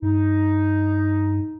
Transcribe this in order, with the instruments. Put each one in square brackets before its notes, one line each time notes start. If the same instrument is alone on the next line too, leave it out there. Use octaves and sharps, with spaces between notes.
[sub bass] G2 [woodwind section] D#4